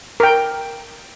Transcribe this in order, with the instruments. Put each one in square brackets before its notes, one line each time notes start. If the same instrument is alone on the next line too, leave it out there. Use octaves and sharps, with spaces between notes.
[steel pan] A#4 G5